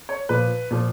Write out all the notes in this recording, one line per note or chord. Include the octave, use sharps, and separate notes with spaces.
C#5
A#2 F3 B4
A#2 F3